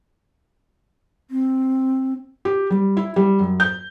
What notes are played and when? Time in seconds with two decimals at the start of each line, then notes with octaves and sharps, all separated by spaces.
1.31 C4
2.45 G4
2.70 G3
2.97 E4
3.16 G3
3.39 F#2
3.60 G6